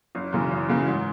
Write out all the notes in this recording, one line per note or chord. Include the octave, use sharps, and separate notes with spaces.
F#1
F#2 C#3 E3
F#1
F#2 C#3 E3
G#2